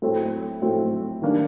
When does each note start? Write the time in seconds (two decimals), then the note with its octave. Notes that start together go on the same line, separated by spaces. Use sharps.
0.02 A2 F#3 A3 C4
0.62 A2 F#3 A3 C4
1.22 D#3 G3 A#3 D4